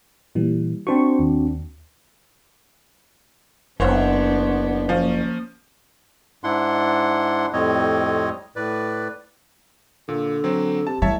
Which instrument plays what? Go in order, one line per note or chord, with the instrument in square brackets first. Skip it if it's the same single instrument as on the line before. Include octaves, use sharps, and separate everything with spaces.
[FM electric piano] A#2 E3 G3
[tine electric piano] C4 D4 F#4 [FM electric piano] C5 C#6
[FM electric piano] D#2
[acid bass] F#1 [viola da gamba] B3 D4 [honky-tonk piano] C5 C#5 F#5
[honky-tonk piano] F3 [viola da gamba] A#3 C#4
[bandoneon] G#2 D4 E4 F#5 C6
F2 A2 G3 C4 C#5 D#5
A2 B4 D5
[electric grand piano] A#2 [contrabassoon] D3
[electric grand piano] F#3 C4
[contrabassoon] C3 [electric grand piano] A5
[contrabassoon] A1 [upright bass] G3 [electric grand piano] C#5 E5 A5